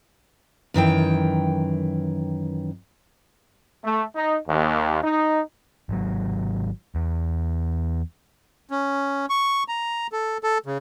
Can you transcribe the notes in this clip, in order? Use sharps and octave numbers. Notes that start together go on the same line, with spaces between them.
F#2 D#3 E3 G5
A3
D#4
D#2
D#4
G#1 F#3
E2
C#4
C#6
A#5
A4
A4
C#3